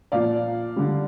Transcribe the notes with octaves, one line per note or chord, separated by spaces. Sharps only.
A#2 F3 D5 F5
D3 G3